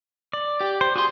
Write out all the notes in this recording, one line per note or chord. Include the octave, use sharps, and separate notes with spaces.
D5
G4 G5
C5
F#4 G#4 C6